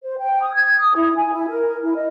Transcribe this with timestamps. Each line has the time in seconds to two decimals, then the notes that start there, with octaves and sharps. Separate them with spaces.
0.03 C5
0.19 G5
0.42 D#6
0.54 G#6
0.78 D#6
0.95 E4
1.16 G#5
1.32 E4
1.49 A#4
1.83 E4
1.96 D#5